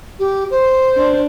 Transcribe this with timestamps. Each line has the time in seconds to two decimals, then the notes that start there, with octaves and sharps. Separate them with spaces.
0.19 G4
0.50 C5
0.97 D4